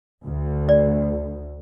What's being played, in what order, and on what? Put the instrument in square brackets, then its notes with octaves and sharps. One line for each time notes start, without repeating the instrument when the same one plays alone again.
[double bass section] D2
[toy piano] D5